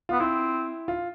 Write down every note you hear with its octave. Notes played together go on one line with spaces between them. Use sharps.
B3 F4
C4 E4
F4